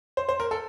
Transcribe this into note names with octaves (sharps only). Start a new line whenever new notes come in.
C5
C5
A#4
A4